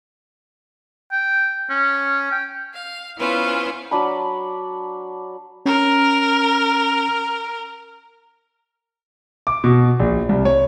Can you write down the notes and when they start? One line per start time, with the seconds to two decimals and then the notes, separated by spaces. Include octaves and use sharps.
1.12 G5
1.70 C#4
2.32 G5
2.73 F5
3.18 B3 C#4 E4 F4 B4 C5
3.91 F#3 D4 B5
5.66 C#4 A#4
9.47 D6
9.64 B2
9.99 A#1
10.29 C2
10.45 C#5